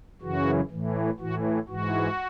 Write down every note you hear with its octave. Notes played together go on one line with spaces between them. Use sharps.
F#2 C#3 E3 F#4
A2 E3
A2 E3 F#4
G#2 E3 F#4